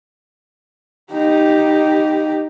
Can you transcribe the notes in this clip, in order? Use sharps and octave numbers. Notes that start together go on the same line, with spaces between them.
D#4 G4